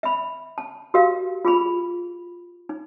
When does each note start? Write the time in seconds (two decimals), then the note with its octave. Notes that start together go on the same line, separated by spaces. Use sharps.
0.03 E5 B5
0.58 A5
0.94 F#4 G4 A#4 F5
1.45 F4 G#4 B5
2.69 D#4